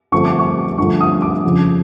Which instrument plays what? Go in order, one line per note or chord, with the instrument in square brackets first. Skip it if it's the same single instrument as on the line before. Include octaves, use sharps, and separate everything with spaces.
[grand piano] G2 D3 F3 A3 C4 C#6
D6
C#6
G2 D3 F3 A3 C#6
D#6
D6
F2 C#3 F3